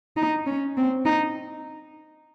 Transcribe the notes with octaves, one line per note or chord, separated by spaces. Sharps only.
D#4
C#4
C4
D#4